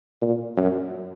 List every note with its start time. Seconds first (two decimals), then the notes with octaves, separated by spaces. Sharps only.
0.22 A#2
0.57 F#2